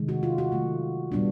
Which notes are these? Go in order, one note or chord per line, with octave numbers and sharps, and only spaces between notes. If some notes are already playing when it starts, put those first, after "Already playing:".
Already playing: C3 D#3 G#3
F#4
F4
F#4
D#3 F#3 A3
A#2 G3 B3 D4